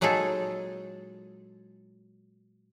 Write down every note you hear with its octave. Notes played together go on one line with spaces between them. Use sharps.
A#2 F#3 G#3 D#4 G#4 A4